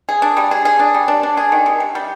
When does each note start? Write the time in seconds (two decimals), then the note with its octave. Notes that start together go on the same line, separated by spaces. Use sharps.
0.09 G#4
0.22 D4
0.37 G3
0.51 G#4
0.65 G#4
0.79 D4
0.94 G3
1.08 D4
1.23 D4
1.37 G#4
1.52 D#3
1.66 C3
1.80 C3
1.95 G3